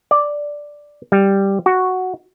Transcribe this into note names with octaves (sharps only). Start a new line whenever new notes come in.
D5
G3
F#4